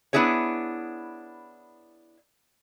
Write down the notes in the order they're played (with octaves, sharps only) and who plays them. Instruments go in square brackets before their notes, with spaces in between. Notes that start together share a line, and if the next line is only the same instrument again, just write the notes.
[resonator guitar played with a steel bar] B3 D4 E4 G#4 C#5